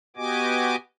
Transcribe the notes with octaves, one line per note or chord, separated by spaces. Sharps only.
B3 F#4 G4 D#5 G#5 D6